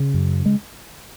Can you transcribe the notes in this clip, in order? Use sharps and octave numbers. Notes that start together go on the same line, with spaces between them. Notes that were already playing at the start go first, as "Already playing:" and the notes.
Already playing: C#3
F#2
G#3